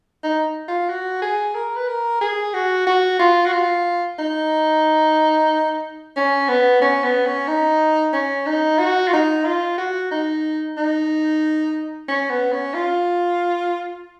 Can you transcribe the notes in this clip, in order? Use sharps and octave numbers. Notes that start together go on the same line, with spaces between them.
D#4
F4
F#4
G#4
A#4
B4
A#4
G#4
F#4
F#4
F4
F#4
F4
D#4
C#4
B3
C#4
B3
C#4
D#4
C#4
D#4
F#4
F4
D#4
F4
F#4
D#4
D#4
C#4
B3
C#4
F4